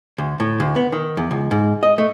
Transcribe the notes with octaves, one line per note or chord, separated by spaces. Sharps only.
D2
A2
D2
B3
D#3
E2
C#2
G#2
D#5
A3